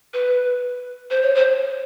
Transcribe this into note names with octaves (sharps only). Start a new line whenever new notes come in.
B4
C5
C#5
C5